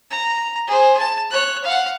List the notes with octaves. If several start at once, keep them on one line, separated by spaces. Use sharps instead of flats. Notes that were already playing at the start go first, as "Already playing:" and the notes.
A#5
G#4 C5
A5
C#5 F#6
F5 F#5